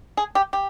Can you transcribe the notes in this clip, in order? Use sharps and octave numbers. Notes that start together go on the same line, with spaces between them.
G#4
G4
G4